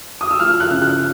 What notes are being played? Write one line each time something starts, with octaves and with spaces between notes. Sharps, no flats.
D#6
E6
F3 F6
F#6
C#3
F#6